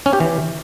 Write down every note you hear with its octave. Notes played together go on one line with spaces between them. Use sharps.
C#4
G4
E3